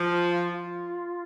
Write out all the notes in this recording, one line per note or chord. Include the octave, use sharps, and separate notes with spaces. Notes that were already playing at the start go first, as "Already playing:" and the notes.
Already playing: F3 F4
F4